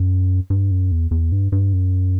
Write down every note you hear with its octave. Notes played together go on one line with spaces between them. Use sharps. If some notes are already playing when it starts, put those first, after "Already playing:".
Already playing: F#2
G2
F#2
E2
E2
G2
G2
F#2